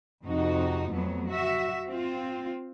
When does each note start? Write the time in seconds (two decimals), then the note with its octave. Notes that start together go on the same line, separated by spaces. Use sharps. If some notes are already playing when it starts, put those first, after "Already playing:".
0.25 F2 C3 D#4 F#4
0.91 F2 F#3 A3 B3
1.28 F#4 E5
1.87 C4 F4